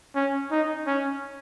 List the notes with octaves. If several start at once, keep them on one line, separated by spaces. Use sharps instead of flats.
C#4
D#4
C#4